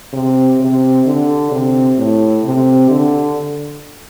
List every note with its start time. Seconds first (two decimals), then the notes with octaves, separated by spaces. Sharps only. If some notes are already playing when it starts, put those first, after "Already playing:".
0.13 C3
0.60 C3
1.06 D3
1.51 C3
1.98 A2
2.45 C3
2.90 D3